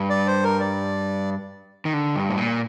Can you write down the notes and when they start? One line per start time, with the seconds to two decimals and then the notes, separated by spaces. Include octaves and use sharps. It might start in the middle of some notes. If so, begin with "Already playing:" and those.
Already playing: G2
0.10 D5
0.27 C5
0.44 A#4
0.60 D5
1.85 D#3
1.94 D3
2.16 G2
2.30 A2
2.38 A#2